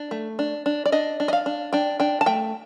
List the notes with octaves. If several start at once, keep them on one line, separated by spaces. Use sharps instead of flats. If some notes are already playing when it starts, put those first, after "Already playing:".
Already playing: D4
A3
D4
D4
D5
D4 D#5
D4
D#5
F5
D4
D4 G5
D4 G5
A5
A3 G5